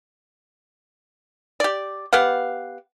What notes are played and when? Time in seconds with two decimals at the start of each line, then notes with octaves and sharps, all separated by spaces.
1.60 G4 D5
2.13 B3 G4 F5 F#5